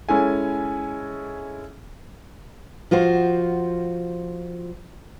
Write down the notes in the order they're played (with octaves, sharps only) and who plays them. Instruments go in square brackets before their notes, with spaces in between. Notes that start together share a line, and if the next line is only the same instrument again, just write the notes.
[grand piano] G#3 C#4 E4 A4 G#5
[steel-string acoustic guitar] F3 F4 F#4 C5